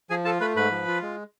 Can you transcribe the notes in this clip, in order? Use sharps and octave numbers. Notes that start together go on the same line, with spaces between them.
F3 G#4 G#5
F4 A4 A5
A3 B4 B5
G#2 B4 B5
F3
F4
G#3